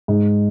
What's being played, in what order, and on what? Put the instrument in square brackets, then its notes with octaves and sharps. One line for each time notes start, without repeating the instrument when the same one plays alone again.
[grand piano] G#2